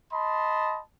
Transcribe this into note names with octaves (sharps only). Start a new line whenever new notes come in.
D#5 A5 B5 C6